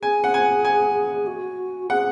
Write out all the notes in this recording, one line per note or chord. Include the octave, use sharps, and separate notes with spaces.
G#4 G#5
F#5
G#5
G#5
F#4
G#4 F#5